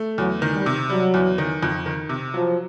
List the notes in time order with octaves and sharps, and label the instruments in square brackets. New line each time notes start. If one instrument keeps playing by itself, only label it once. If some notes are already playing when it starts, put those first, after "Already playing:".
Already playing: [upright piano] A3
[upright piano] E2 [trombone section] F#3
[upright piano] D#3
[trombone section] G3
[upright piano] C3
[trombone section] F#3 [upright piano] G3
[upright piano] E2
D#3
F2
D#3
C3
[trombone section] F3 [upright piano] F#3